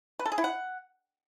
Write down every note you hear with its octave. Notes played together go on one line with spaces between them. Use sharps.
B4
A4
G#4
E4
F#5